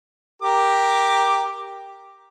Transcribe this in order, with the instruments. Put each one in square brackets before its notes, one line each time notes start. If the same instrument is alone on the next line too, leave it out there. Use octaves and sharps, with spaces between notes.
[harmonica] G4 A#4 D6